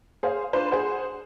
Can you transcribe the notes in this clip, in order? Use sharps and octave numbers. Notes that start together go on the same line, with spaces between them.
G#4 C5 C#5 F5
D4 F4 B4 C5
G#4 C5 F#5